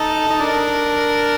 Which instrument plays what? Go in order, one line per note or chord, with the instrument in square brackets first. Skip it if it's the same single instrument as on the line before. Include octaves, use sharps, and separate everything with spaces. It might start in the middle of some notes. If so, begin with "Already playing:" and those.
Already playing: [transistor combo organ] D#4 [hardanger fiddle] A4
[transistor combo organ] D#4
[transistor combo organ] D4 [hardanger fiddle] A#4